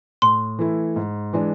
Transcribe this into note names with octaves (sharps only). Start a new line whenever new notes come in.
A2 C6
E3 A3 E4
G#2
E3 G#3 D4